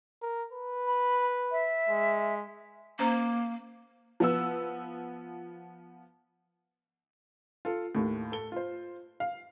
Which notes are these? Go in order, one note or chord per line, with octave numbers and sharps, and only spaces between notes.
A#4
B4
B5
E5
G#3
A#3 C#4 C5 A#5
F3 B3 E6
F4 A4
D#2 A2
A4 G7
F4 C5
F5